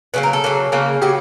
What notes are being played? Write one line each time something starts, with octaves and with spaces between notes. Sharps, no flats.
C#3 F#3 A#3 B4
A#4
A4
C#3 F#3 A#3
C#3 F#3 A#3
C#3 F#3 A#3 G4